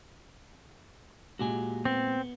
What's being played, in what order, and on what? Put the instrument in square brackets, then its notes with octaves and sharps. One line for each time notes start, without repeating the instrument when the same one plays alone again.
[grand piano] A#2 G#3 [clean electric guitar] F#4 G4 G#5
[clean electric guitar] B3 [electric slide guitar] C4